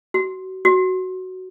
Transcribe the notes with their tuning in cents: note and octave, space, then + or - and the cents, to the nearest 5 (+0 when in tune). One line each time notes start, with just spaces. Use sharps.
F#4 +30
F#4 +10